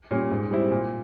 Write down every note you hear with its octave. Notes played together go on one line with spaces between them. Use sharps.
A#2 G3 C#4
G#2
G3 C4 E4
A#2